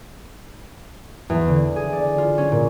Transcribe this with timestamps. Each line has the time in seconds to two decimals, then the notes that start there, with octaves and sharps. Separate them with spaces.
1.30 E2
1.48 D3
1.76 G#4
1.93 D5
2.18 F4
2.38 C#4
2.52 A#2